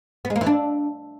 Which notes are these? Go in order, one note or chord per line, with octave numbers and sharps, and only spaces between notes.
B3
G#3
A#3
E3
D4